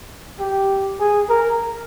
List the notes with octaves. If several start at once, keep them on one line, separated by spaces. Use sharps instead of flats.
G4
G#4
A#4